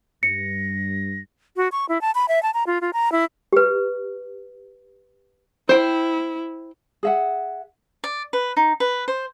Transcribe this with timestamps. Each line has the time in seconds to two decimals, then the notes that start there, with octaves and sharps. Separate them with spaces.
0.23 G2 A#6 C#7
1.57 F#4
1.72 C#6
1.89 E4
2.01 A5
2.15 B5
2.28 E5
2.43 A5
2.54 A#5
2.67 F4
2.81 F4
2.93 A#5
3.12 E4
3.53 G4 B4
5.69 E4 C5 G5
7.03 G#4 E5 F#5
8.04 D5
8.33 B4
8.57 D#4
8.80 B4
9.08 C5